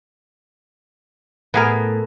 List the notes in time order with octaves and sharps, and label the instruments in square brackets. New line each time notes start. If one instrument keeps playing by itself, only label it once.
[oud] A2 [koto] B3 G#4 A#4